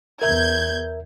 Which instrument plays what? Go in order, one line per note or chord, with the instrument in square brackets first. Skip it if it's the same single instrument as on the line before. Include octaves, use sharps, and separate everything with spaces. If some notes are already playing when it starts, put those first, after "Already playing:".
[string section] E2 G6 G#6 [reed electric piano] A#4 E5